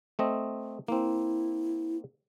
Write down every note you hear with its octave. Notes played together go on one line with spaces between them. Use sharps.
A3 C4 D#5
A#3 C4 E4